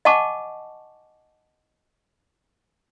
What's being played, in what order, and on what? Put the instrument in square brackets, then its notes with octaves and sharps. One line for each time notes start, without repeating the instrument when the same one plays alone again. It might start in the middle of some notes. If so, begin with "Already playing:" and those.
[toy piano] D#5 F#5 G#5 A5 C#6 D6